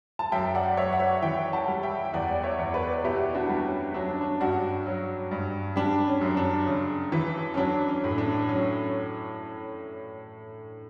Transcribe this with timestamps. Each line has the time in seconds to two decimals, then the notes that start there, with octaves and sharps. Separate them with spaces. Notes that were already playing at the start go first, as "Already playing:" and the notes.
0.19 A5
0.32 F#2 E5 G5
0.55 D5 F#5
0.77 F#2 C#5 E5
0.93 F#5
0.99 C#5 E5
1.22 E3 E5 G5
1.53 F#5 A5
1.68 G3
1.83 E5 G5
2.05 G5
2.13 E2 D5 F#5
2.32 D5
2.43 C#5 E5
2.59 E2
2.74 B4 D5
3.04 B2 E4 G4
3.35 D4 F#4
3.49 G3
3.64 C#4
3.94 F#3 D4
4.08 C#4
4.21 D4
4.40 G2 D4 F#4
4.86 F#3
5.31 G2
5.76 G3 D4
6.07 C#4
6.21 F#2
6.37 D4
6.67 C#3
7.12 E3
7.54 C#4
7.57 F#3 D4
7.89 C#4
8.04 A2
8.18 D4
8.49 F#3 C#4